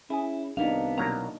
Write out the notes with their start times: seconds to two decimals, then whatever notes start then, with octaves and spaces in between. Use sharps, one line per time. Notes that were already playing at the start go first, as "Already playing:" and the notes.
0.10 C#4 E4 G#4 G#5
0.57 C2 B3 D4 D#4 F5
0.98 B2 F#3 A#3 A#5